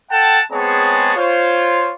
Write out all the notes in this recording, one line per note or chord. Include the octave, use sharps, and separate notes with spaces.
A4 F#5 G5 A5
G#3 B3 C4 G#4 C#5 A5
F4 C5 C#5